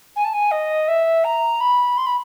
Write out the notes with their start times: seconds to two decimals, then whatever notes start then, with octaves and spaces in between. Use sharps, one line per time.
0.16 G#5
0.25 A5
0.33 G#5
0.51 D#5
0.88 E5
1.24 A#5
1.61 B5
1.98 C6
2.06 B5